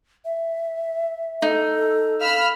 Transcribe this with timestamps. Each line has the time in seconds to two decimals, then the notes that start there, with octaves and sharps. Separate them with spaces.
0.25 E5
1.42 D#4 A4
2.20 F5 B5 E6 F6